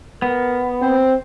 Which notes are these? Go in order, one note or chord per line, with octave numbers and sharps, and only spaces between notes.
B3 A#4
C4 C5